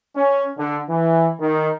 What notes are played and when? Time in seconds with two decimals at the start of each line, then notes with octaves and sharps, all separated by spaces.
0.15 C#4
0.58 D3
0.89 E3
1.40 D#3